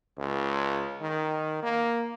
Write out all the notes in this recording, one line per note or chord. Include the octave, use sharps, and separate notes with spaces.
C#2
D#3
A#3